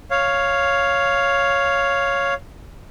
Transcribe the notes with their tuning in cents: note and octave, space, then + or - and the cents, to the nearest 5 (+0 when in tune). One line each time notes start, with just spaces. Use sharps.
C#5 +0 F5 +0